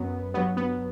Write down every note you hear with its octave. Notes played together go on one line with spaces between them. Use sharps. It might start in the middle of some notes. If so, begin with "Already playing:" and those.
Already playing: F#2 F#3 B3
G2 F#3 B3
B3